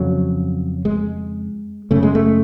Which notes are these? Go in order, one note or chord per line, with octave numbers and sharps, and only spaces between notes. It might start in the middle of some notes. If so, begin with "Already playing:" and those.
Already playing: F2 C#3 F#3
G#3
F#2 C#3 A3
G#3
A3